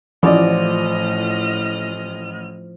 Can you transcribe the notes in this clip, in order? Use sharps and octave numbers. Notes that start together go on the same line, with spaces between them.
A1 A2 F3 D5 D#5 F6